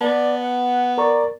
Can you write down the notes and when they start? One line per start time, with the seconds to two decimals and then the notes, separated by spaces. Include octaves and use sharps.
0.01 B3 D5 A5
0.41 F#5
0.98 A#4 D5 A#5 C#6